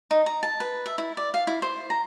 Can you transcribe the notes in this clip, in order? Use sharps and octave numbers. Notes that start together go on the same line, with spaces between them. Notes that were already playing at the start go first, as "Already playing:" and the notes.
D#4
A#5
A5
B4
E5
E4
D5
F5
E4
C5
A#5